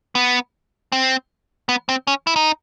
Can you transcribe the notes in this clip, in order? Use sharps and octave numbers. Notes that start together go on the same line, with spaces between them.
B3
C4
B3
C4
C#4
E4
D#4